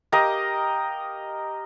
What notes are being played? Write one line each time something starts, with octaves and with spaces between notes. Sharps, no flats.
G4 A#4 D#5 F5